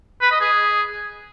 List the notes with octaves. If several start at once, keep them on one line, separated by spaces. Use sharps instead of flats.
B4
D#5
G#4